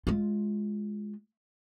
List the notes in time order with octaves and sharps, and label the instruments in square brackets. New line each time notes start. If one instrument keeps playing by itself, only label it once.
[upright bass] G#3 F4